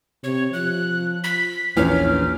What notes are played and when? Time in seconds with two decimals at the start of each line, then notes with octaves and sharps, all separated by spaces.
0.24 C3 C#5
0.53 F3 F#6
1.24 B6
1.77 A#1 E2 C#4 F6